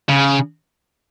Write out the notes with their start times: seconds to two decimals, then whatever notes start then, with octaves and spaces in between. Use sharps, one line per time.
0.09 C#3